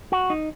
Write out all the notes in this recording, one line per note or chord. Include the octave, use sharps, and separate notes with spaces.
F#4
D#4